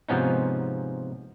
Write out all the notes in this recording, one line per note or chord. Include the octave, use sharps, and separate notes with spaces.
G#2 C3 F3 B3 C#4 D#4